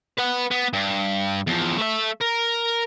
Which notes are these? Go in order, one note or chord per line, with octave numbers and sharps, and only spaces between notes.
B4 F#5
B3
G2
E2 F3
A3 E5
A#4